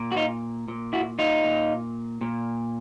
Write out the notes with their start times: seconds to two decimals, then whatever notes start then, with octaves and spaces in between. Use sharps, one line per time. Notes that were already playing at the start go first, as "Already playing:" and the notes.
Already playing: A#2
0.12 F#4
0.16 D#4 F4
0.68 A#2
0.93 E4 F#4
1.19 D#4 F4
1.44 A#2
2.21 A#2